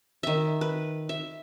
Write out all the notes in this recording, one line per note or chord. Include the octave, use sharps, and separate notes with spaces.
D#3 E5
B4
E5